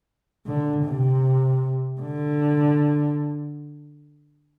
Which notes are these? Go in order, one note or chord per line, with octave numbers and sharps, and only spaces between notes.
D3
C3
D3